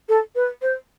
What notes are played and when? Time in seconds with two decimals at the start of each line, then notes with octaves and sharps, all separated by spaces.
0.09 A4
0.35 B4
0.62 C5